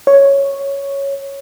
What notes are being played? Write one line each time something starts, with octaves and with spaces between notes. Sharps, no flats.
C#5